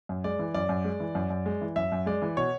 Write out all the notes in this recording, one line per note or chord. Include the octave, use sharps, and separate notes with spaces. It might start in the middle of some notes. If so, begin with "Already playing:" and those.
F#2
G#3 D5
E3
F#2 D5
F#2
G#3
E3
F#2
F#2
G#3
E3
F#2 E5
F#2
G#3 D5
E3
B2 C#5